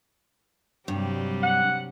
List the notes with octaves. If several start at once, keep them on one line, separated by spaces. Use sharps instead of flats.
G2 C3 F#3 G3
F#5